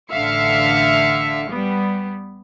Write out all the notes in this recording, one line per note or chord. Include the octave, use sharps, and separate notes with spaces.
A1 D3 E5 F5 F6 C#7
G3 B3